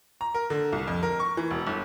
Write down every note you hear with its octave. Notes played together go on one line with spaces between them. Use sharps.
A#5
A#4
D3
C2
F2
A#4
C#6
E3
E1
G1